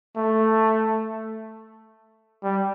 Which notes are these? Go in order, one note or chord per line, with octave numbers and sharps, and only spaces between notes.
A3
G3